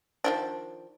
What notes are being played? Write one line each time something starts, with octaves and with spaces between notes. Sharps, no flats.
D#3 F3 D4